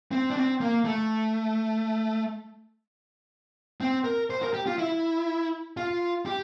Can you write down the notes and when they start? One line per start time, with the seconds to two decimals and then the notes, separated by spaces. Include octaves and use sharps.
0.11 C4
0.30 D4
0.36 C4
0.61 A#3
0.85 A3
3.81 C4
4.04 A#4
4.30 C5
4.42 A#4
4.53 G4
4.67 F4
4.78 E4
5.77 F4
6.26 G4